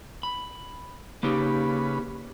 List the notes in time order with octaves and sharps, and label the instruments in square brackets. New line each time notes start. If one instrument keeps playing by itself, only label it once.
[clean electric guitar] B5
[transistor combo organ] C#3 B4 [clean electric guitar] A#3 D#4 G4